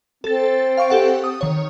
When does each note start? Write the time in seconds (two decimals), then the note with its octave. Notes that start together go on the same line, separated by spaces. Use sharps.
0.24 C4 A4 A6
0.77 F5 C#6 D7
0.90 G4 A4 F#5
1.24 D#6
1.41 D#3 C#5